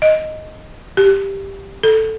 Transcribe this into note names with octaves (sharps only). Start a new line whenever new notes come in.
D#5
G4
A4